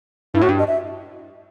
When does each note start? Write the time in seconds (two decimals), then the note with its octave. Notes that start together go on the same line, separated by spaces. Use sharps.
0.34 G2 E4
0.41 A2 F#4
0.48 G2
0.59 D#5
0.68 E5